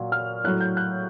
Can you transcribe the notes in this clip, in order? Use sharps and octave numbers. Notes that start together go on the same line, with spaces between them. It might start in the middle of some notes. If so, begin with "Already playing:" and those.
Already playing: A#2 F#3
F6
A2 F#3 F#6
G6
F#6